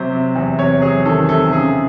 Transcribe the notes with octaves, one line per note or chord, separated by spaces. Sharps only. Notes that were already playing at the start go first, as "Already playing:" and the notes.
Already playing: C3 F#3 C5
C3
E2
C3 C#5
F#3 G#4
D#3 A4
C3 A4
C#3 G#4